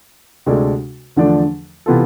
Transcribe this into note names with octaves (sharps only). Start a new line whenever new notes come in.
D2 C3 G#3 D4 A4
E2 D3 F3 A3 D4
C3 E3 B3 F4 A4